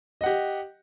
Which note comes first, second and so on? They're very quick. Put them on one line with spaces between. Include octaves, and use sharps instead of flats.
D#5 F#5 G4